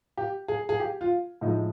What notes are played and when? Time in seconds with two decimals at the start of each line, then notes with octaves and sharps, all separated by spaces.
0.17 G4
0.48 G#4
0.69 G#4
0.80 G4
1.01 F4
1.41 A2 F3 G#3 D#4